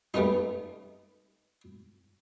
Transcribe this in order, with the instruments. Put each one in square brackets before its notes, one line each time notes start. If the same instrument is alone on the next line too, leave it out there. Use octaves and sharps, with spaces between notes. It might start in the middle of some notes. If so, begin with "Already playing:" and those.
[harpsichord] G3 A3 B3 C#4 D#4